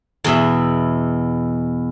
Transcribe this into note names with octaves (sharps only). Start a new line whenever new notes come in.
E2 B2 E5